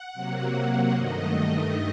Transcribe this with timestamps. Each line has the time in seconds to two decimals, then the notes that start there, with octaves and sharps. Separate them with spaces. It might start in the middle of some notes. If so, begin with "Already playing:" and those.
Already playing: F#5
0.14 C3 F#3 A#3
0.95 G2 D#3 A3 D#5